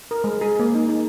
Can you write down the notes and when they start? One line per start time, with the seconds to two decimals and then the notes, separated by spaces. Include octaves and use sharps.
0.11 A#4
0.24 G#3
0.41 G#4
0.59 A#3
0.75 D#4
0.89 D#4